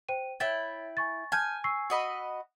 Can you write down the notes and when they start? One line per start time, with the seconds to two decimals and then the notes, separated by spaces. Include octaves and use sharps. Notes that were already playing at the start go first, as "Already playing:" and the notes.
0.09 C5 G5 D#7
0.40 E4 C#5 E5 G5 A6
0.97 G#5 C#6 A6
1.32 G#5 A5 F6 G6
1.64 C#6 E6 C7
1.90 F#4 D#5 B5